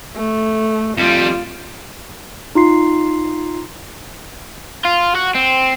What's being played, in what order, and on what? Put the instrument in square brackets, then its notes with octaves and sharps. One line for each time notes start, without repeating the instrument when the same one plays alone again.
[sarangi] A3
[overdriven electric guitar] F2 G3 [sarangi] F4
[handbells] D#4 F4 C6 C7
[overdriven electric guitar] F4
F#4
C4